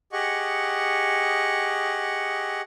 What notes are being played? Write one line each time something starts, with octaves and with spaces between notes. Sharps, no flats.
G4 G#4 D#5 F#5 C#6